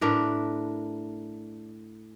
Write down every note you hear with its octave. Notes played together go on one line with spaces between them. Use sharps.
A2 D4 A#4 B4